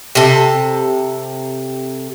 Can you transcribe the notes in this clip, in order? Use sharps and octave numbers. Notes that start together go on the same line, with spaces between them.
C3 A4